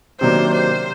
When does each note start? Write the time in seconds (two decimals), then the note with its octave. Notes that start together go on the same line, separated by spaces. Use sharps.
0.20 C3 D#3 F#3 A#3 D4 C5
0.53 C5